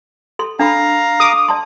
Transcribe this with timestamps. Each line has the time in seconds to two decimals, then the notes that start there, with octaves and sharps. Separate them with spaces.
0.39 A4 C6
0.59 D4 A4 F5 A#5 B5
1.20 A4 D6 D#6
1.48 D5 A5 C6